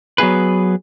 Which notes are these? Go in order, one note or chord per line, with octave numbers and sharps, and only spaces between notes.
F#3 B3 G#4 B4